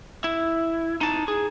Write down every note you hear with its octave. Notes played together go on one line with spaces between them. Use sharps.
E4
D#4 A5
G#4